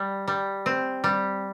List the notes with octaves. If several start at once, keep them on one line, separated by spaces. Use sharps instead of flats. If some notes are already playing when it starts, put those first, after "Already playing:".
Already playing: G3
G3
C4
G3